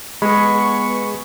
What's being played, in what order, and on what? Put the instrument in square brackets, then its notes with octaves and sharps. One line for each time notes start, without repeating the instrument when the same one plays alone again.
[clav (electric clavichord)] G#3 [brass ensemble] B3 [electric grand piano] G#4 B5 [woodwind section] C#6